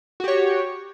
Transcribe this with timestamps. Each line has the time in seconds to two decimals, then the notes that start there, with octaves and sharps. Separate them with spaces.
0.20 F#4
0.24 G4
0.28 C#5